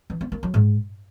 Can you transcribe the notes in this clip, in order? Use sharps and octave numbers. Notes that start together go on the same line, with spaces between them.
E3
B3
A#3
F#3
G#2